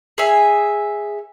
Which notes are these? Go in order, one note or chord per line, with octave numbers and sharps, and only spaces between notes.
G#4 C#5 E5 G#5